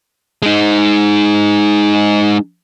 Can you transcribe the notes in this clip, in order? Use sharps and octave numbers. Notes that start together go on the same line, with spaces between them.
G#3 D#4